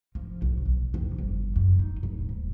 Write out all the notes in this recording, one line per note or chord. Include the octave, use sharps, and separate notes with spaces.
F3
B1
B1
F2
G1
F#2
D#4
D1
D#1